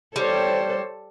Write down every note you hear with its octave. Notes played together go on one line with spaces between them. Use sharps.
G3 A4 C5 C#5